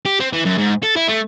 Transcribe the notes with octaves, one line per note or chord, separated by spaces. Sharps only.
G4
C4
E3
F#2
G#2
A4
E4
A3